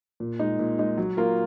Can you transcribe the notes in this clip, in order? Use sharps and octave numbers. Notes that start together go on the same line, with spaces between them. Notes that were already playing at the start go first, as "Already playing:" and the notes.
A#2
G#3 D#4
A#2
G#3 D#4
F#3
A#3 F4 A#4